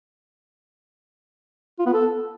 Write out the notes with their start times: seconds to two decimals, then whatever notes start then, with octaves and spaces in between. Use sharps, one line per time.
1.79 F4
1.86 B3
1.93 A4